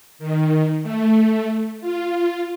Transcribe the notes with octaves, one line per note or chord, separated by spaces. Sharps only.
D#3
A3
F4